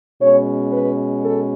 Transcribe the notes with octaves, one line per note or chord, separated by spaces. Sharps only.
B2 G#3 C#4 C#5
B4
A4